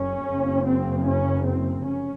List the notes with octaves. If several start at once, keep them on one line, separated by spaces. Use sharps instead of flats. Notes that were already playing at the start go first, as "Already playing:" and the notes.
Already playing: F#1 F#2 C#4
F#1 F#2 C#3
C4
C#4
C4
F1 C#4